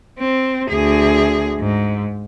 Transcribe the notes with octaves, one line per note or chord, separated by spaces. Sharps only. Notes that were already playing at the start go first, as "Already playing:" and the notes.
C4
D2 G#4
G#2